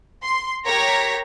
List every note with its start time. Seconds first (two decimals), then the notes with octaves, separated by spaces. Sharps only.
0.23 C6
0.65 G4 A#4 C#5 A#5 A#6 B6